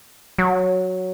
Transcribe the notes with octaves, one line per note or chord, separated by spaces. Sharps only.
F#3